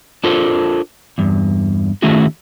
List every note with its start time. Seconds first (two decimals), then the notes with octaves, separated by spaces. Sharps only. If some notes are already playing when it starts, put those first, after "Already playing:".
0.24 D4 F4 A4 A#4 C5
1.18 E2 G2
2.02 D#3 A3 C#4 E4 F#4 G#4